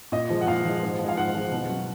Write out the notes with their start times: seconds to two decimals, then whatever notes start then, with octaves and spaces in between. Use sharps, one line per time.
0.12 A#2 D#5
0.30 F3 G#3
0.41 F#5
0.47 A#2 F5
0.65 F3 G#3
0.83 G#2
0.99 F3
1.04 G#3 F5
1.17 G#2 F#5
1.35 F3 G#3
1.52 B2
1.69 F#3